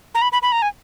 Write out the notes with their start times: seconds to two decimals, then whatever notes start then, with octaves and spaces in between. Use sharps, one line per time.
0.15 A#5
0.22 B5
0.32 B5
0.42 B5
0.52 A#5
0.62 G#5